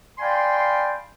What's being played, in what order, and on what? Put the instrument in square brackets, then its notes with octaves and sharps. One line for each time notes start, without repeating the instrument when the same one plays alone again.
[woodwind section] D5 F5 G5 G#5 B5 C6